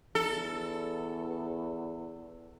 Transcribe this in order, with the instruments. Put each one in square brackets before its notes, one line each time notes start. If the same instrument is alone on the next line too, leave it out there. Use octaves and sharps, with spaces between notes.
[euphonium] E2 [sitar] A4